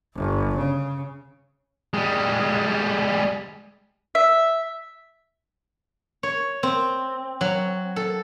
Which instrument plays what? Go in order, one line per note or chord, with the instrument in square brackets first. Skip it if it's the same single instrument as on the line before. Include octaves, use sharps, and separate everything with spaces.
[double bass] G1
C#3
[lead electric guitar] G3 G#3
[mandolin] E5
[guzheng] C#5
C4
F#3
A4